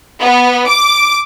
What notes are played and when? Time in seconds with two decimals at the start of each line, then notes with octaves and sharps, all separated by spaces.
0.21 B3
0.68 D6